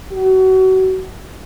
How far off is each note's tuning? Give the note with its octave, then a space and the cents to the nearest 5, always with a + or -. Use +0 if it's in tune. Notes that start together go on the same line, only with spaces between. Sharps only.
F#4 +30